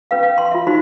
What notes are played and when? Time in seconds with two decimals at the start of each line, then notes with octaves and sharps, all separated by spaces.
0.11 C#4 B4 F5
0.23 F5
0.38 C6
0.52 F4 E5
0.67 D#4 F#4 C5 C6